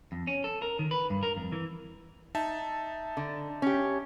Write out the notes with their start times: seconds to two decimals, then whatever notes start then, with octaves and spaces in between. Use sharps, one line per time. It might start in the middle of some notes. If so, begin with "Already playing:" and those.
0.12 F2
0.27 C#4
0.44 A4
0.62 A#4
0.79 D#3
0.91 B4
1.10 G2
1.23 A#4
1.37 F2
1.52 E3
2.35 D#4 E5 A5
3.17 D3
3.62 C#4 G4